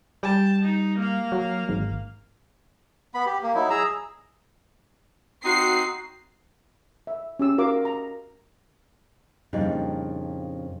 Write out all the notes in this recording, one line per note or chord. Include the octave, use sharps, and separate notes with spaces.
G3 G5 A5
D#4
A#3 F5
F#3
G#1
B3 B5
G4
A#3
F#3 D#4 E4
G#4 A#5 E6
C4 D#4 F#4 C7
E5
C#4 G4 E6
F#4 A#4 F5 D6
A#5
F2 A#2 C#3 G3 D4 D#4